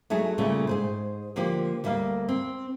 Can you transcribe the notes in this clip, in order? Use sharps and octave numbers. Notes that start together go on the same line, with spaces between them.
F#3 A3 D#4 G#4
A#2 C#3 G3 A3
G#2 G#4 C5
D3 F3 A#3 G4
D2 G3 A#3 F5
C4